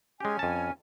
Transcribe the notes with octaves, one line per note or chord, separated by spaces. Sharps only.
G#3 C#4 G4 G#5
F2 A5